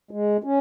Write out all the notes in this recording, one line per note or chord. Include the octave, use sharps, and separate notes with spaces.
G#3
C#4